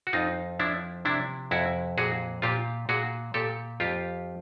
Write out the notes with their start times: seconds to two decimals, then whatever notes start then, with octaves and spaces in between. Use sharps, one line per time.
0.07 F#4
0.13 F2 D#4 F4
0.60 F3 D4 E4
1.05 C3 D4 E4
1.51 F2 E4 F#4
1.98 A#2 F#4 G#4
2.42 A#2 F4 G4
2.89 A#2 F#4 G#4
3.34 A#2 G4 A4
3.80 F2 F4 G4